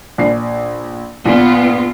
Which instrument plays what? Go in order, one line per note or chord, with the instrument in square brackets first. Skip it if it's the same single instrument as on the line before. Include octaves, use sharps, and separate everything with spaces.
[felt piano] A#1 C7
[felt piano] A#1 [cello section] B3 F4